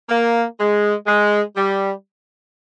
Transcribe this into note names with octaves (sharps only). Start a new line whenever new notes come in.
A#3
G#3
G#3
G3